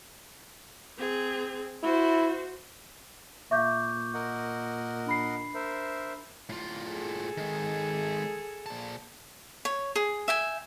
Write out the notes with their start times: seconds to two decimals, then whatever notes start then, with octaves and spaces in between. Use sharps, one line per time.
0.98 C4 G#4
1.83 E4 F#4 C5
3.51 A#2 E5 F5 C#6 D6 G6
4.14 A#4 D#5 F#5
5.06 D4 B5 C7
5.54 A#4 C5 E5
6.49 A2 F4
6.89 G#4 A4
7.37 D#3 G#3
8.66 A#2 A5
9.65 C#5
9.96 G#4
10.28 E5 G5 G#5